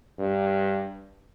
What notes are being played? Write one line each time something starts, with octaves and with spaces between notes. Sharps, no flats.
G2